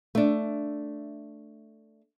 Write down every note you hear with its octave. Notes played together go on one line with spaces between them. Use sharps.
A3 D4